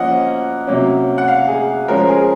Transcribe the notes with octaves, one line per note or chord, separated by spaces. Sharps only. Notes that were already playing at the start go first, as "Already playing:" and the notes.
Already playing: F3 A#3 C#4 D#5 F#5
C3 F#3 A#3 C#4
F#5
F5
G#4
F3 G#3 C#4 A#4
G#4